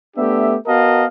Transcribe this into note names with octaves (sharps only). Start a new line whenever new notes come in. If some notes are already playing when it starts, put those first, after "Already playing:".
A3 B3 D4 G4 E5
B3 F#4 A#4 D#5 F5 A5